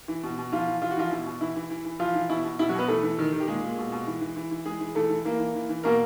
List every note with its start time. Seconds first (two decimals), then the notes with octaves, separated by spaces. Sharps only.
0.08 E3
0.23 B2
0.37 B2
0.52 E3 F3 F4
0.68 E3
0.82 E3 F4
0.91 F#4
0.97 E3 F3 F4
1.11 B2 E4
1.26 B2
1.41 E3 E4
1.56 E3
1.70 E3
1.85 E3
1.99 E3 F3 F4
2.15 E3
2.29 B2 E4
2.44 B2
2.59 B2 E4
2.69 F#3 F#4
2.74 B2 B3 B4
2.88 E3 A3 A4
3.03 E3
3.19 D#3
3.33 D#3
3.40 G4
3.47 A#2 G#3 G#4
3.63 A#2
3.78 B2
3.92 B2
4.07 E3
4.21 E3
4.36 E3
4.51 E3
4.66 E3 G#3 G#4
4.80 E3
4.95 E3 A3 A4
5.10 E3
5.25 E3 A#3 A#4
5.40 E3
5.55 E3
5.69 E3
5.84 B2 A#3 A#4